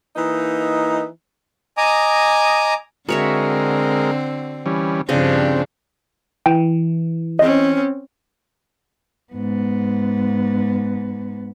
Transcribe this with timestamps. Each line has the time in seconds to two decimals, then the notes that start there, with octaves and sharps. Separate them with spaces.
0.16 E3 A#3 D#4
1.77 D#5 G#5 A#5 D6 D#6
3.09 D3 G#3 C4 F#4 A#4 C#5 E5
4.66 E3 G3 C#4
5.09 G2 C#3 F3 C4 D4 C#5 D#5
6.46 E3 G5
7.39 C4 C#4 D#5
9.33 G#2 B3